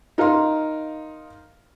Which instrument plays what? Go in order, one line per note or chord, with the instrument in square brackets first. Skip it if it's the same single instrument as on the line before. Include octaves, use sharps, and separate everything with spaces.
[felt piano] D#4 A#4 F5 C6